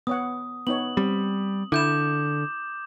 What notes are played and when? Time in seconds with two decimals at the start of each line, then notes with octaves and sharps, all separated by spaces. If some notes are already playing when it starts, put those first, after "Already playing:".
0.07 B3 C#5 F#5 D#6
0.67 B3 D#4 C#5 F#7
0.97 G3 C4
1.72 D3 E4 D6 G6 E7